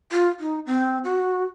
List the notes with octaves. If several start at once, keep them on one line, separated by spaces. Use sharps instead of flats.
F4
D#4
C4
F#4